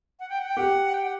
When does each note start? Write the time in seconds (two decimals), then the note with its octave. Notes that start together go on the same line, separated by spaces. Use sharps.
0.20 F#5
0.30 G5
0.39 F#5
0.47 G5
0.57 G4 F#5
0.94 G5
1.04 F#5